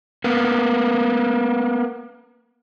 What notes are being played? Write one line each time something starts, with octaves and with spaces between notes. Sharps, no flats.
A#3 B3